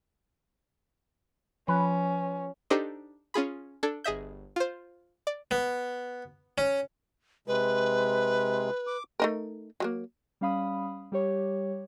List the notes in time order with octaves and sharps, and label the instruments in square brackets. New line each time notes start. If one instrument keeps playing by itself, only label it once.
[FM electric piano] F3 [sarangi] C#4 [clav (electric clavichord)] B4
[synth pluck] D4 D#4 G4 A4 C5 D#5
C#4 F4 G#4 B5
D4 A4 G#6
G1 G#4 D#5 E5 G6
F4 C5
D5
[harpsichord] B3
C#4
[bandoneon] C3 G#3 [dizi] B4
[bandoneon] D6
[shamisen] A3 D#4 A#4
F#3 G#3 A#3
[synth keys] G3 C#4 F5 B5 D#6
G3 G4 C#5